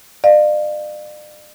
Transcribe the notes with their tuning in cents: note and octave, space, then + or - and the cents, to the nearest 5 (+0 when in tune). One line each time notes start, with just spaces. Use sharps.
D5 +40 F5 +0